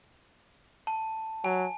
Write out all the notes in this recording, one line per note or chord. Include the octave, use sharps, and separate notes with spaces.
A5
F#3 G#5